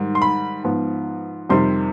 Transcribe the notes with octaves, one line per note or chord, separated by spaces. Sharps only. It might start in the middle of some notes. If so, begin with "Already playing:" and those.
Already playing: G#2 D#3 G3
C6
B5
G#2 F3 B3
F2 C3 D#3 G3 C6